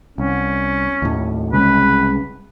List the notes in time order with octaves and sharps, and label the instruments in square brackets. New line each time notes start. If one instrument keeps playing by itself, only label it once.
[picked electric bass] C2 [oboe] C#4
[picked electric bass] D#2 A2
[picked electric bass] C2 C#3 G#3 [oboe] B4